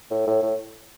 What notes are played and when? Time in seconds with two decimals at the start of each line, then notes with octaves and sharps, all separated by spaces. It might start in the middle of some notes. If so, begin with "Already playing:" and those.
0.11 A2
0.27 A2
0.42 A2